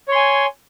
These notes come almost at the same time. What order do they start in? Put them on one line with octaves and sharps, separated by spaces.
C#5 C6 G#5